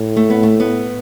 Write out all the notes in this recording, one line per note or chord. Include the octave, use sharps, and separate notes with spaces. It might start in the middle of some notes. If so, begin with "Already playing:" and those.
Already playing: A2
A3
B3
A3
B3